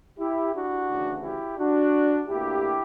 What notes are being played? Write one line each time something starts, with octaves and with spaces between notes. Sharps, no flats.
E4 G4
D4 F#4
D2 C#3 E3
E4 G4
D4 F#4
D2 D3 A#3 E4 G4